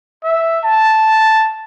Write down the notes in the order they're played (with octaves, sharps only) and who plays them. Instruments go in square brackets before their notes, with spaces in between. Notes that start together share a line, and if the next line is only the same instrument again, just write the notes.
[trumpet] E5
A5